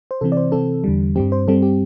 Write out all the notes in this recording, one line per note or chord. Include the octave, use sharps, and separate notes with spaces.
C5
C3 E3 C4 A4
D5
C5
C3 E3 C4 A4
E2 D3 G3
G2 G3 C4 G4
C5
G2 G3 C4 A4
G4